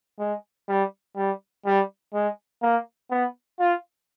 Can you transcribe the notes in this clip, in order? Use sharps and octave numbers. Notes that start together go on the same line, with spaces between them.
G#3
G3
G3
G3
G#3
A#3
B3
F4